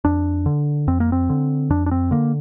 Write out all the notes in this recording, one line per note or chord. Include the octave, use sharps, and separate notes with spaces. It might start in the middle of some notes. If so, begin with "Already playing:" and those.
F2 D4
D3
F2 C4
A#3
C4
D3
F2 D4
D4
C4
D3 A#3